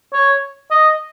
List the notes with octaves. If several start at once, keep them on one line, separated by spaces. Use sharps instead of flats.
C#5
D#5